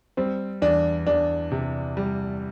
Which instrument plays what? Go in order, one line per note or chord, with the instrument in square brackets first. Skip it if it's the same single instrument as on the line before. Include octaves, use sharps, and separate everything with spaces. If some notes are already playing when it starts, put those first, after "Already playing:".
[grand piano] G3 [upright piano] C4
[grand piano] E2 [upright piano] D4
[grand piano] E2 [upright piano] D4
[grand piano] C3
G3